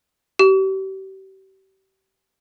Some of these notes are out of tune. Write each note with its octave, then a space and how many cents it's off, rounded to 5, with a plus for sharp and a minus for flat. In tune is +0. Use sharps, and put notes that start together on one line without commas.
G4 -35